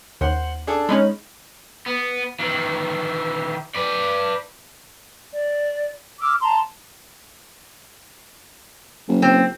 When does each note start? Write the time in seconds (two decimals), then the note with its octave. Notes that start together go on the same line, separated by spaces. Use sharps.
0.21 D#2 C5 F#5
0.67 D4 G#4 A4
0.89 G#3 C#4 D#4 B5
1.86 B3
2.40 D#3 E3
3.75 B4 D5
5.35 D5
6.20 D6 E6 F6
6.41 A5 A#5 C6
9.08 F#1
9.22 C4